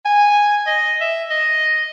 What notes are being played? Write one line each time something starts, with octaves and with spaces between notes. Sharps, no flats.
G#5
D#5
E5
D#5